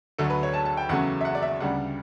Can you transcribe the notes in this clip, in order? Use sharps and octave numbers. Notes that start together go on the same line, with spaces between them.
D2 D3 F#3 A3 A4
B4
C#5
A5
A5
G5
E2 C#3 F#3 A3 C#4 F#5
E5
F#5
D5
E5
D2 C#3 G3 D4 F#5